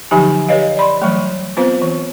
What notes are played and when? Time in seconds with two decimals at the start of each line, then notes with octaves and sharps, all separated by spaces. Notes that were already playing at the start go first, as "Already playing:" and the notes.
0.11 D3 F3 F#3 D#4 G4 G#5
0.48 G4 B4 C#5 D#5 F5
0.77 D5 B5 C6
1.02 E3 F#3 G3 A3
1.57 B3 C4 F4 B4 C5 F5
1.82 E3